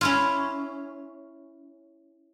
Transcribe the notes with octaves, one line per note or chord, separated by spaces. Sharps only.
C#4 E4 F4